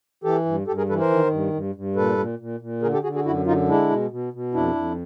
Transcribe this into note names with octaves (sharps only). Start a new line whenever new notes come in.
E3 G4 A4
G2
G2 G4 A4
G#4 A#4
E3 A4 B4
A#4 C5
D#3
G2
G2
G2
A#2 A4 B4
A#2
A#2
A#2
D3 G#4 A#4
G4 A4
D3 F#4 G#4
F#4 G#4
F#2 E4 F#4
D3 D#4 F4
G#3 D4 E4
B2
B2
B2
F2 D4 E4
F2